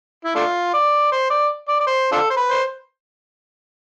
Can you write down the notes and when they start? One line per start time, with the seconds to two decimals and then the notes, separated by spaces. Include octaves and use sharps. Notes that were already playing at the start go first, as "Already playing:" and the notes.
0.25 E4
0.35 A3 D4 F4
0.73 D5
1.12 C5
1.30 D5
1.68 D5
1.80 D5
1.87 C5
2.12 D4 F4 A4
2.30 C5
2.37 B4
2.50 C5